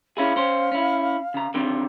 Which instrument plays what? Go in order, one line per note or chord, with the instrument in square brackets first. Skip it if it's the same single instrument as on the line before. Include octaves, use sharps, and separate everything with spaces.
[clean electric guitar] C#4 E4 G#4 [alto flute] F5
[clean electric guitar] C#4 C5
C#4 E4
C#3 A#5
D3 D#3 C4